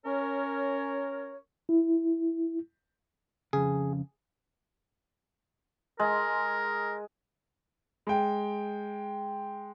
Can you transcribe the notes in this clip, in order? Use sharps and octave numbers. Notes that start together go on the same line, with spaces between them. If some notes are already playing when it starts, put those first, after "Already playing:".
C#4 A#4 C#5
E4
F2 C#3 G#4
G#3 A#4
G#3 G5